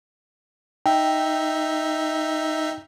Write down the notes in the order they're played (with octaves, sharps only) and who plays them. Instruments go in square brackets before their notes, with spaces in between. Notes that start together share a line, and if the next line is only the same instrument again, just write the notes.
[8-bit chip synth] D#4 E5 [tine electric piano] G5